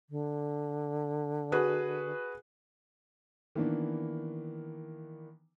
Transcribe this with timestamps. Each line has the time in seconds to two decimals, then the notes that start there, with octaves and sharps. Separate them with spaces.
0.10 D3
1.52 F#4 G#4 B4
3.55 D#3 E3 A#3 B3 D4